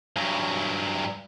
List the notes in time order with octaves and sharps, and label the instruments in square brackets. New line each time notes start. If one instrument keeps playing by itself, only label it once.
[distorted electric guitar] G2 F#3